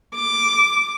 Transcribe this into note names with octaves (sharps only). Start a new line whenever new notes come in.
D6